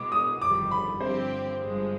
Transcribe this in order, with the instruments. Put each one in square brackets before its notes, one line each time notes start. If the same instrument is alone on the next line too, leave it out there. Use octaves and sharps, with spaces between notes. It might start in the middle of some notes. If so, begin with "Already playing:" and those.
Already playing: [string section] B2 G#3 B3 [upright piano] D6
[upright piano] D#6
[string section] G1 F2 D#3 G3 [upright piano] D6
[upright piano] B5
[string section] G2 D3 F3 C4 G4 [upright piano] C5
[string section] G1 G2 F3 G#3